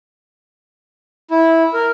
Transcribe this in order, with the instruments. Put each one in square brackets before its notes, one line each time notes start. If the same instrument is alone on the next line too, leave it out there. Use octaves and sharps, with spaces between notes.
[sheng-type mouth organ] E4
A#4